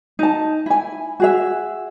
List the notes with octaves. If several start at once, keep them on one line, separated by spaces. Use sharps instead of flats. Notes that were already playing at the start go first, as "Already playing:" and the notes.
D#4 A5
E4 G#5
F#4 G#4 E5